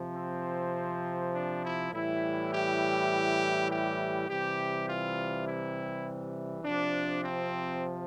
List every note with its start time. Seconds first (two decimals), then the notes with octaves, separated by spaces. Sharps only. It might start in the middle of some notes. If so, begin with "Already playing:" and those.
Already playing: C3 F3
0.16 C4
1.34 D4
1.64 E4
1.93 A2 E3 G3 E4
2.52 G4
3.70 G4
4.28 C3 E3 G3 G4
4.87 F4
5.45 E4
6.63 C3 F3 D4
7.22 C4